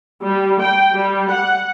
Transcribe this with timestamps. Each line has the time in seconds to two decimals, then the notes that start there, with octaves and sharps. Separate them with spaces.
0.23 G3
0.61 G5
0.93 G3
1.30 F#5